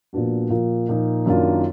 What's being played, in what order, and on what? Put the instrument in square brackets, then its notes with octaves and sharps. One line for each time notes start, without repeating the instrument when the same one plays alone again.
[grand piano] A#2 F3 B3 D4 F#4
A#2 F3 A#3
A#2 F3 A#3 D#4
F#2 D#3 A#3 D4 F4